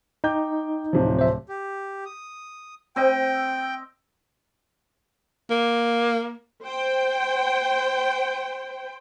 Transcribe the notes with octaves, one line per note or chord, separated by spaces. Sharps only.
D#4 G5 D6 G6
D1 C3 F3
C5 E5
G4
D#6
C4 D#5 G5
A#3
C5 G5